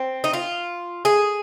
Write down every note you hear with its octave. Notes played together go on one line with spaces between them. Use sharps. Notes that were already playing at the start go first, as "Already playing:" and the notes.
Already playing: C4
D#4
F4
G#4